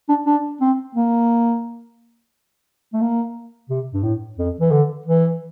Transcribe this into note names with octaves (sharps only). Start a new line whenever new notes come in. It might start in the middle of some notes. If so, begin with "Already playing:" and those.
D4
D4
C4
A#3
A3
A#3
C3
G2
A2
F2
E3
D3
E3